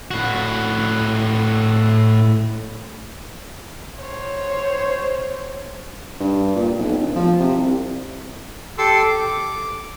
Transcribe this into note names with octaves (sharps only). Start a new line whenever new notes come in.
A2 F#4
C5 C#5
G2
A#2
B1
D1
F3
C3
C2
G4 A4 C6 D6 E6
D6